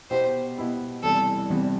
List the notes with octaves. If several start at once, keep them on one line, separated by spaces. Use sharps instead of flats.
B2 B3 E4 G4 C5
B2 B3 E4 G4
E2 C3 E3 G3 A4
E2 C3 E3 G3